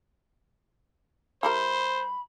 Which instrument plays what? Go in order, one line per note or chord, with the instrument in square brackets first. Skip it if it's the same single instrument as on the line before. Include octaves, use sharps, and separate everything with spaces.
[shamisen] G3 E4 A#4 [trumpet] C5 [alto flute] B5